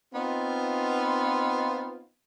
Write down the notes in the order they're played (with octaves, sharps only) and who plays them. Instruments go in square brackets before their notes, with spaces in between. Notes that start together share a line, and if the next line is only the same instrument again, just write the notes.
[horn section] B3 C4 D#4 F4